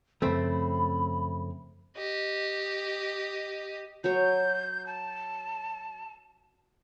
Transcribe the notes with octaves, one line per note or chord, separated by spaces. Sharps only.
F#2 C#3 F3 A3 C4 B5
G4 D#5
F#3 C#5 G6
A5